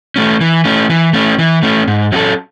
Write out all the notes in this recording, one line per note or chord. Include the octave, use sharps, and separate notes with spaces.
A3 C#4
E3
A3 C#4
E3
A3 C#4
E3
A3 C#4
G#2
F#3 C#4 F#4 A4